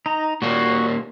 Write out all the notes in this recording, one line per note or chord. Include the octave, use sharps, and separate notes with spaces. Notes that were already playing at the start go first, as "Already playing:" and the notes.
D#4 A#5
A#2 G3 A#3 F#4